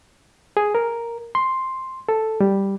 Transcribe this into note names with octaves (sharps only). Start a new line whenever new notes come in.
G#4
A#4
C6
A4
G3